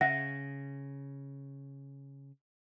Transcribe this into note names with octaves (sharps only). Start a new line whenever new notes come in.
C#3 E5 F#5 A#6